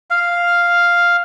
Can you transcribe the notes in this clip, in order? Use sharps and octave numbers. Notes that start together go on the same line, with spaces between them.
F5